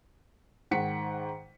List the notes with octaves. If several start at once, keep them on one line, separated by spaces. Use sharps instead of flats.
G#2 D#3 F#5 B6 C#7